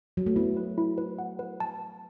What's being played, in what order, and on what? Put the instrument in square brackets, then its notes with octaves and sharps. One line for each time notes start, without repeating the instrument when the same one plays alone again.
[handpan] F#3
A3
[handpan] B3 [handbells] E4
[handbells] B4
E4
B4
F#5
B4
A5